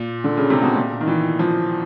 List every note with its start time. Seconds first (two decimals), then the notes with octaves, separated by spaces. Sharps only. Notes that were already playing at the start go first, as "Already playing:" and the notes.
Already playing: A#2
0.24 D3
0.37 C#3
0.50 C3
0.62 B2
0.75 A#2
1.01 D#3
1.08 E3
1.39 F3